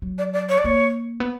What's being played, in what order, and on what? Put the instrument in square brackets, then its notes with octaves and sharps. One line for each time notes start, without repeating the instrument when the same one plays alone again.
[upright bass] F#3
[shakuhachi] D5
D5
C#5
D5
[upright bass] A#3 [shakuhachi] C#5
[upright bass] B3